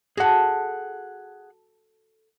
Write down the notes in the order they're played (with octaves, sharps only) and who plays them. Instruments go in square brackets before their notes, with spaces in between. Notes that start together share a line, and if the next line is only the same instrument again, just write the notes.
[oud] F#4 A4 [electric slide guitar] G#4 F#5